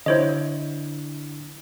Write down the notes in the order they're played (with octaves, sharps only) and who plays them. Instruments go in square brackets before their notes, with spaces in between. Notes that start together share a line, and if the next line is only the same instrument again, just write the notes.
[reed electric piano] D3 D4 E4 [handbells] C5 C#5 D#5